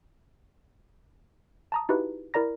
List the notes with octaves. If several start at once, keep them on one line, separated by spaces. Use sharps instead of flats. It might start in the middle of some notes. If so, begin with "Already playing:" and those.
A5 A#5 D#6
D#4 E4 F#4 G4 B4
E4 A#4 D5 A#5 A#6